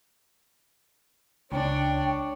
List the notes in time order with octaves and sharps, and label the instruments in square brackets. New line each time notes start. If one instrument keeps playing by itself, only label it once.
[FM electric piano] C#2 [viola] D4 [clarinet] C#5 [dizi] G5